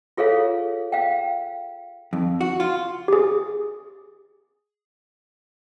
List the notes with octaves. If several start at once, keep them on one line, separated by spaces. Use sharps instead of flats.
F4 G#4 A4 C#5 F5
F5 G5
F2
F#4
F4
G4 G#4